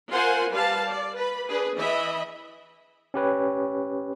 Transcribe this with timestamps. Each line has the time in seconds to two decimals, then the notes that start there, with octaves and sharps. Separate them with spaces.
0.10 F4 A#4 C5 F#5 G#5 C6
0.51 G3 B4 F5 A5
0.87 D5
1.16 B4 B5
1.47 D4 G#4 B4
1.76 E3 D#5 E5 B5
3.14 C#4 G4 B4 C#5